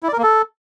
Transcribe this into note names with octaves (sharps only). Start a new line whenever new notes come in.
E4
D5
A#4
A#3
A4